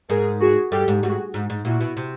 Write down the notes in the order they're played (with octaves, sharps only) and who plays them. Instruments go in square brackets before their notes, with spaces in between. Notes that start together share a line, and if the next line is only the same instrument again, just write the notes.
[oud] G#2 [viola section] G#4 A#4
[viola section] F#4 G#4
[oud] G2 [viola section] G4 A4
[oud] G#2
[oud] G#2 [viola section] F#4 G#4
[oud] G#2
G#2
[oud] A#2 [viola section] E4 F#4
[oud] B2
C3